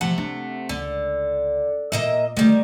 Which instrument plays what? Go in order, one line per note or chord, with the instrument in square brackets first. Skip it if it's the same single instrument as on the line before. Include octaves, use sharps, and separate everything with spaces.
[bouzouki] C3 A3 F#5 [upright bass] F3
[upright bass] D4
[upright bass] C#2 [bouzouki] D3
[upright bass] A#2 [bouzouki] A#3 D#5 E5
[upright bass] D3 A3 [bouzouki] D#3 G3